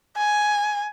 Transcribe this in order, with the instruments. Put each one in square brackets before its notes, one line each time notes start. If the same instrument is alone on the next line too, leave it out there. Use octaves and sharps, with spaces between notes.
[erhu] G#5